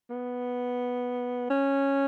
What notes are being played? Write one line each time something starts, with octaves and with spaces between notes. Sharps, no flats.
B3
C#4